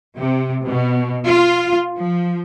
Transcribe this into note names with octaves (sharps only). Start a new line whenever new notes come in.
C3
B2
F4
F3